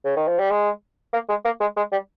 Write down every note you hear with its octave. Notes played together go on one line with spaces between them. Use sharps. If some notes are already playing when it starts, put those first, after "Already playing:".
C#3
D#3
F3
G3
G#3
A#3
G#3
A#3
G#3
G#3
G3